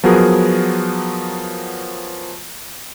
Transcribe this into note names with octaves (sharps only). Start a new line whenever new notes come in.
F3 F#3 B3 F#4 G#4 A#4